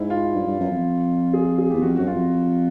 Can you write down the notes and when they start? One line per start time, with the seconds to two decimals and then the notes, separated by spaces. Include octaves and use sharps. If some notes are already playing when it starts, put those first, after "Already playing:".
Already playing: G#2 E4
0.10 F4
0.35 G2
0.47 G2
0.60 F#2
0.71 F2
1.34 G#4
1.58 G#4
1.70 E2 G4
1.82 F2 F#4
1.96 F#2 F#4
2.07 F4
2.15 F2